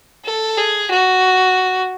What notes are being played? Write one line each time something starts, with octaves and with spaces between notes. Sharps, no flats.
A4
G#4
F#4